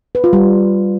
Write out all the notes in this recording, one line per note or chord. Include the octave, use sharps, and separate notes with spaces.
B4
F4
G3